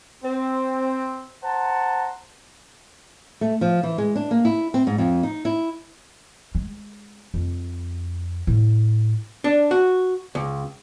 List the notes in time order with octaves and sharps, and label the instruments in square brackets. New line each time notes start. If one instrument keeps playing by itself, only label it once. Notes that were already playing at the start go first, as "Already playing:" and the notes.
[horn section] C4
C5 F#5 A5 A#5
[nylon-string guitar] A3
F3
E3
G#3
D4
A#3
E4
C4
G#2
F2
D#4
E4
[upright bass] G#3
F2
A2
[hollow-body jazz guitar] D4
F#4
C#2